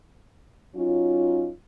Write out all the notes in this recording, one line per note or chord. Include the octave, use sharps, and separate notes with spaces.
F#3 C#4 D#4 F4